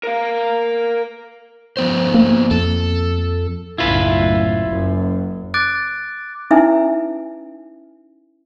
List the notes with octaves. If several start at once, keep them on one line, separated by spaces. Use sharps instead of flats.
A#4 F5
F3 B3 C5
A#3
F2 A4
F#1 B1 A2 E4 F4 B4
F#1 F#2
D6 F#6 A6 D7
C#4 D#4 E4 B4 E5 G#5